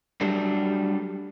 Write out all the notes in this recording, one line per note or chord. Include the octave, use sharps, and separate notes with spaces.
F#3 G3 A3 D4